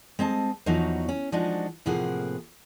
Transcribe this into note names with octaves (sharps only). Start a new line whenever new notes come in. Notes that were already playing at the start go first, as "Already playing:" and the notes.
G#3 C4 D#5 A5
E2 F3 F#3 D#4 F#4
C#4
F3 G#3 D4 D#4 F#4
A2 C3 F3 A#3 G#4 F#5